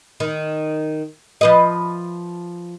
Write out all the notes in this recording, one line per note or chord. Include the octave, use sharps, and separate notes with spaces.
D#3
F3 B4 D#5